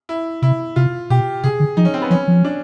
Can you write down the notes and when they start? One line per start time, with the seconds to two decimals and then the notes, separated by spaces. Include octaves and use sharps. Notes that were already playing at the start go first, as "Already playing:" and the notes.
0.09 E4
0.42 C3 E4
0.76 C3 F4
1.10 B2 G4
1.44 C3 G#4
1.60 D3
1.77 F3 D#4
1.85 C#4
1.94 C4
2.02 B3
2.10 F3 C#4
2.28 F3
2.45 D4